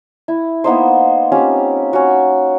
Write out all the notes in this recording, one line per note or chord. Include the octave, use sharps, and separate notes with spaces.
E4
A#3 B3 D#4 C5
C4 C#4 F4 G4
C#4 F#4